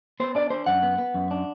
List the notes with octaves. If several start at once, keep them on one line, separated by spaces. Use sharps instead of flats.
B3 C5
D4 D5
D4 C5
F#2 F#5
B3
B3
F#2
D4